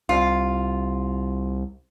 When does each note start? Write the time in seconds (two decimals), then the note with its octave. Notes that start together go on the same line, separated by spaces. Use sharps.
0.09 C2 F4